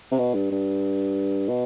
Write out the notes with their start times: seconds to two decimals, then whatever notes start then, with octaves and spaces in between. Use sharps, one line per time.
0.12 C3
0.19 B2
0.35 G2
0.51 G2
1.49 B2